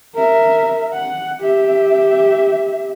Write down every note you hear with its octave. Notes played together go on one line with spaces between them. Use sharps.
A#4 E5
F#5
G4 E5